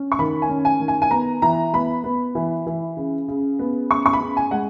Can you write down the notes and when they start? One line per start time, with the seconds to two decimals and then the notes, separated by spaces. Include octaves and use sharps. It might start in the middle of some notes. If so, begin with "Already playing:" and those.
Already playing: C#4
0.12 C#6
0.19 D#3 B5
0.42 G#5
0.49 C#4
0.65 G#5
0.80 D#3
0.88 G#5
1.02 G#5
1.11 B3 A#5
1.42 E3 A#5
1.73 B3 B5
2.04 B3
2.35 E3
2.66 E3
2.97 C#3
3.28 C#3
3.59 B3
3.90 C#3 C#6
4.06 C#6
4.13 B5
4.20 C#3
4.37 G#5
4.51 G#3 F#5